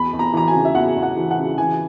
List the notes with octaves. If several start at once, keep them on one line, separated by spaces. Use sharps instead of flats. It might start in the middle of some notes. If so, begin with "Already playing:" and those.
Already playing: E2 B5
E2
A#5
E3 A#5
G#5
C#3
E5
E2 F#5
E2
F#5
E3
F#5
C#3
E3 G#5